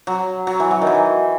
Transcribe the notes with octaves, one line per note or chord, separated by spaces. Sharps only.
F#3
F#3
E3
F#3
D#3
E3